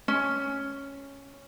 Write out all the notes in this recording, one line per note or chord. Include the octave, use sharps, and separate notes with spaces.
C#4